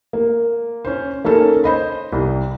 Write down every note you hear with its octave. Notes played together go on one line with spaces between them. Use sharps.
A#3
C#4 C5
A#3 C#4 D#4 A4
C5 D#5 B5
C2